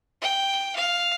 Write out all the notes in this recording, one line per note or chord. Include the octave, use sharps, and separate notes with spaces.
G5
F5